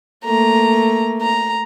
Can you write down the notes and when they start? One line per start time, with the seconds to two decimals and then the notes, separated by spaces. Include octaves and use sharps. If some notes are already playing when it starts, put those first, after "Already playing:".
0.25 A3 A#3 A#5
1.22 A#5